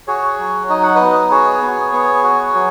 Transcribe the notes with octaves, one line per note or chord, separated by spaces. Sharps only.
F#4 G#4 C#5
F#3
D#4 D#5
F#5
B4 D#5
B3
F#4 G#4 C#5
B3
B3
F#4
F#3